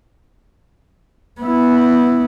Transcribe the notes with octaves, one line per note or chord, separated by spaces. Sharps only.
B3 E4